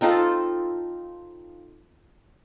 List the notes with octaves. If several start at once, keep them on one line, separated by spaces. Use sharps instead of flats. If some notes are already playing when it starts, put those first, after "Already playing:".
C4 D#4 F4 A4